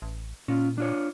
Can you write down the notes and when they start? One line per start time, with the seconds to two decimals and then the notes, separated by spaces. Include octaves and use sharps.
0.02 A1
0.48 A#2 C#4 F4
0.78 D4 F4 C#5